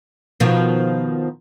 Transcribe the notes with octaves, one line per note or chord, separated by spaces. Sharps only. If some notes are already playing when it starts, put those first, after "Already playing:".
B2 D#3 F3